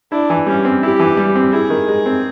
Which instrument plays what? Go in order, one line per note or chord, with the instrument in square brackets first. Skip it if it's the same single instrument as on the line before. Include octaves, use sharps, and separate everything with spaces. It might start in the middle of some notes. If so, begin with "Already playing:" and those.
[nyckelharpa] D4 [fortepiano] E4
[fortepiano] E3
[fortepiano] G3 [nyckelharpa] C#4
[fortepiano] C4
[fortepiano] E4 [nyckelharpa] G4
[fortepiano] E3
G3
C4
[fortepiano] E4 [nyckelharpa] G#4
[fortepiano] D#3
G#3
C4